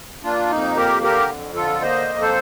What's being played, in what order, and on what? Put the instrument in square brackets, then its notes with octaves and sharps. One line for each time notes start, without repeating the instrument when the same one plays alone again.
[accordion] A#3 D4 F4
F2 D#4
A#3 G4 A#4
D3 G4 A#4
F2
D3 F4 A4
A#3 C5 D#5
F2
A4 C5